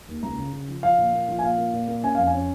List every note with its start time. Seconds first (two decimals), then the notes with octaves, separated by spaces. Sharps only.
0.08 D#2
0.23 C#2 A#5
0.38 C#3
0.53 C#3
0.68 F3
0.83 F3 F5
0.98 A#2
1.13 A#3
1.28 F3
1.39 G#5
1.43 A#2 F5
1.58 A#3
1.73 A#2
1.88 A#3
2.03 C#4 G#5
2.15 F2 F5
2.27 G#5
2.34 C#4